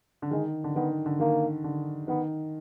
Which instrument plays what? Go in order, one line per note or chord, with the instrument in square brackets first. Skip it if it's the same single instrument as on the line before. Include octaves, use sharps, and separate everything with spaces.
[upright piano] D3
[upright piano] D#3 [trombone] G#3
[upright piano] D3
[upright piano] D#3 [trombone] B3
[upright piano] D3
[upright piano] D#3 [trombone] A#3
[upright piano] D3
[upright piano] D#3 [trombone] B3